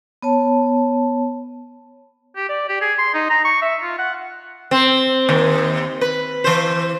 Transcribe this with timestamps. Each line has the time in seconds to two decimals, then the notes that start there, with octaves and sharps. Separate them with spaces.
0.23 B3 C#5 A5
2.36 G4
2.49 D5
2.69 G4
2.81 G#4
2.99 C6
3.14 D#4
3.30 A#5
3.44 C#6
3.62 E5
3.82 F4
3.98 F#5
4.71 C4
5.29 D#2
6.01 B4
6.44 E3 C5